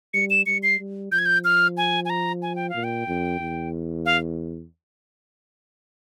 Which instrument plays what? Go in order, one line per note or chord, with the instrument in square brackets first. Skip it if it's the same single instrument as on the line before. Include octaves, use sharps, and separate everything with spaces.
[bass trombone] G3 [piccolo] C#7
[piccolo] E7
[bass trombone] G3 [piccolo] C#7
[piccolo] C7
[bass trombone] G3
[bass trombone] F3 [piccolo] G6
[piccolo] G#6
G6
F6
G#5
G#5
A#5
G#5
G5
[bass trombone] A#2 [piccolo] F5
[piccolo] G5
[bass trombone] F2
E2
[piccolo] F5